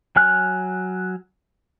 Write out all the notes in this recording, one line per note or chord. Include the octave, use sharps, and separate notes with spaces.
F#3 G#5 F6 F#6